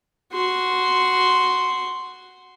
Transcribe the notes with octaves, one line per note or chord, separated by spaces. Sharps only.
F#4 C6